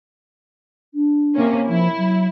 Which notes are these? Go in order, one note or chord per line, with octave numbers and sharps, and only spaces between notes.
D4
C3 A#3 C#4
F3 E4
F#3